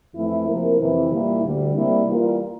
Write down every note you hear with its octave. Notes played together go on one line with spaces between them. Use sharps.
F2 E3 A3 E4
C3 F3 A#3 E4 A#4
F2 C3 E3
A#2 G3 A#3 E4
D2 D3 G3
C3 G3 A#3 E4
E3 G3 A#3 F4 A#4